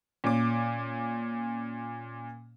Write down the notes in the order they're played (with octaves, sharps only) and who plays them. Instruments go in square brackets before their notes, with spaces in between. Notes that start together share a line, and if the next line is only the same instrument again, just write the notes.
[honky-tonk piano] A#2 C#4 D6